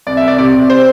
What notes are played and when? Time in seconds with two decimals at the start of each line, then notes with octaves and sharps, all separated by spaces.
0.07 C2 D5
0.17 E5
0.23 C2
0.28 D5
0.38 C3 D5
0.54 C3
0.70 C5